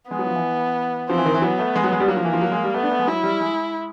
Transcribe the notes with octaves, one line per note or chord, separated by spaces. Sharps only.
G#3 B3
F#3
F3
E3
F3 C4
E3
D#3
E3
F#3 B3
A3
G#3
F#3
G#3
G3
F#3 A#3
F3
E3
F3
F#3
G#3
G3
A3 B3
D4
A3
G#3
F#3 E4
G3
G#3